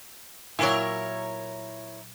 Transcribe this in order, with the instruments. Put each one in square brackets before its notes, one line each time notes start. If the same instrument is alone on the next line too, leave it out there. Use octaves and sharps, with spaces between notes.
[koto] A#2 F#3 [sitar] E4 A#4 C#5